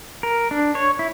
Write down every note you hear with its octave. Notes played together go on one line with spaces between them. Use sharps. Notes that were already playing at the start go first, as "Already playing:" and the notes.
A#4
D4
C#5
E4